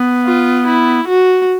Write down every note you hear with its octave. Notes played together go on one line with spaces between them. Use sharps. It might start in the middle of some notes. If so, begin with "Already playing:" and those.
Already playing: B3
F4
E4
F#4